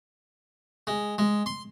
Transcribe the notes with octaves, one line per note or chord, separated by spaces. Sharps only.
G#3
G#3
C6